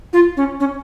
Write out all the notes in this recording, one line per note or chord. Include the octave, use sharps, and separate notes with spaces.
F4
C#4
C#4